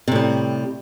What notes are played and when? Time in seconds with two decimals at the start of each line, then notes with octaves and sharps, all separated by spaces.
0.08 C3
0.12 A2
0.16 G3